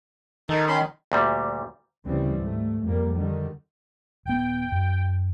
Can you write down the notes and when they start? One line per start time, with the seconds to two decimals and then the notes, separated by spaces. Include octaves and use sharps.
0.49 D#3 D#4 A4
0.68 C#4 B5 C6
1.12 D2 A#2 G3
2.05 D2 C#3 E3 G3 C4
2.37 G#2 A3
2.83 F2 G3 A#3
3.13 D3 D#3 G3
4.25 D#1 B3 G5
4.72 F#2